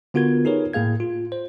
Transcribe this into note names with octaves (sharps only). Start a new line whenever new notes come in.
D3 B3 F4 F#4 A#4 G#6
D#4 G4 G#4 A#4 B4 C#5
A2 A#3 G#4 F5 G#6
F4
C5